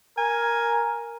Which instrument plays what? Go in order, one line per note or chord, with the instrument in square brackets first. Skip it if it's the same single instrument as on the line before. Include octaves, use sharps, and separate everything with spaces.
[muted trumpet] A#4 [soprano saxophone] G#5